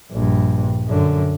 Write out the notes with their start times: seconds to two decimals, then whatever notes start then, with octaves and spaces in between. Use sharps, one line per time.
0.11 A#1 G2
0.87 F#2 D3